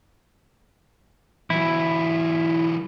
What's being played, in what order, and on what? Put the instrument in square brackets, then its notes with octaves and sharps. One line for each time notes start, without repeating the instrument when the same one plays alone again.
[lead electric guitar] E3 F#3 [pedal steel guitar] E4